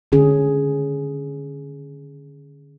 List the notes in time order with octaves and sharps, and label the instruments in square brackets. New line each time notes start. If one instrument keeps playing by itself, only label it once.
[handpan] D3 D#3 C#4 G#4